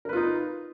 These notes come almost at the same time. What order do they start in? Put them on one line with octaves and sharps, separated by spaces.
A#4 B4 F4 D#4